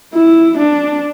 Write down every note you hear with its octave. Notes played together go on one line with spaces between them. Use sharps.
E4
D4